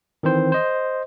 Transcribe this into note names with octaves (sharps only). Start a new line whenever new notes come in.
D#3 E3 C4 C5
C5 D#5